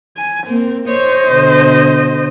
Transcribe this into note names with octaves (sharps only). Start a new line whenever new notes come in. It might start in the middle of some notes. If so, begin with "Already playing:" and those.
G#5
A#3 C4
C5 C#5 D#5
B2 D3